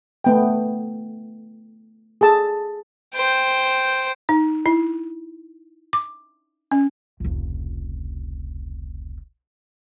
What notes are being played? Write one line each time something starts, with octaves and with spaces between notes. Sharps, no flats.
A3 B3 G5
G#4 A4 A5
C5 G5
D#4
E4
D6
C#4
F1 C#2